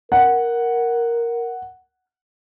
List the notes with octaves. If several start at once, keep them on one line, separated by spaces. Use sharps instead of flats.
A#4 F#5